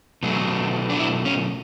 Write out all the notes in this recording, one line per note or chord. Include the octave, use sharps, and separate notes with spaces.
B2 F#3 A3
D4
E4
C#4